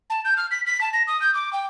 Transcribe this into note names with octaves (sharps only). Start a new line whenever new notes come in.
A5
G6
F6
B6
B6
A5
A#6
D#6
G6
D6
G5